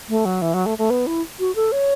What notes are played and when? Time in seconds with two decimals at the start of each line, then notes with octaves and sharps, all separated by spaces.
0.09 A3
0.25 F#3
0.42 E3
0.54 F#3
0.66 A3
0.78 A3
0.90 B3
1.07 E4
1.40 F#4
1.56 A4
1.72 C#5